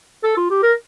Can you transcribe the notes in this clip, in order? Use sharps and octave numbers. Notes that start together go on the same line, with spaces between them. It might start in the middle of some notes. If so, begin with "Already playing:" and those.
A4
F4
G4
A#4